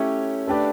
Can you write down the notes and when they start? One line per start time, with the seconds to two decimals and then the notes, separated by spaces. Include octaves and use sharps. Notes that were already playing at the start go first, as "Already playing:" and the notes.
Already playing: A3 C#4 E4 G4 C#5
0.47 A3 D4 G4 B4 D5